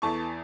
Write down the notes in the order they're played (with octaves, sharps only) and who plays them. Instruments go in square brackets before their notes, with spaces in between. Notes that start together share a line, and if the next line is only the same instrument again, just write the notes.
[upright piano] E2 E3 A3 A5 C#6